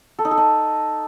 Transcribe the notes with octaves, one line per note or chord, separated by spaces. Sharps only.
A4
D#4
A4
D#4